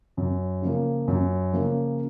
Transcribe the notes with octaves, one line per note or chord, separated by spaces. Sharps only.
F#2
C#3 F3 A#3
F#2
C#3 F3 A#3